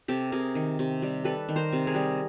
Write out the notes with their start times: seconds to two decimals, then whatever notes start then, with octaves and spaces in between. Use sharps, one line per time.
0.08 C3 G4 A4
0.32 C3 G#4 A#4
0.55 D#3
0.79 C3
1.02 G3
1.24 G3 A4 B4
1.49 D#3
1.56 A#4 C5
1.73 C3
1.87 G#4 A#4
1.95 G3